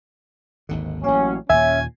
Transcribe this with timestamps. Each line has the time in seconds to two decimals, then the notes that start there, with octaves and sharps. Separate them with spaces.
0.69 G#1 D#2 D3
1.04 A1 F#3 A#3 C#4
1.50 D#2 A#2 C#4 E5 G#5